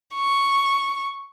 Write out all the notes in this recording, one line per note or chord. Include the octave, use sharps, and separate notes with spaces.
C#6